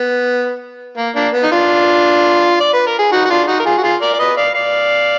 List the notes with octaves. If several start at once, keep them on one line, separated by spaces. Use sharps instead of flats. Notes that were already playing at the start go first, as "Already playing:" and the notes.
Already playing: B3
A#3
A#3 D4
B3
D#4
D4 F4
D5
B4
A#4
G#4
D#4 F#4
F#4
D4 F4
D#4 F#4
A#4
F4 G#4
F#4
F4 G#4
A#4 D5
D5
B4 D#5
D5 F5
D5 F5